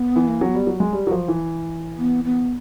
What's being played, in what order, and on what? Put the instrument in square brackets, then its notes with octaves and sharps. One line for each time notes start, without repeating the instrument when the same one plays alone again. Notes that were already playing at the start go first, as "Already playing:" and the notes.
Already playing: [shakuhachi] B3
[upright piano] E3
[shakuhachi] A#3
[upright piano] F#3 [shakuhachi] C#4
[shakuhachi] B3
[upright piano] G3
F#3
G#3
G3
F#3
F3
E3
[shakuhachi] B3
B3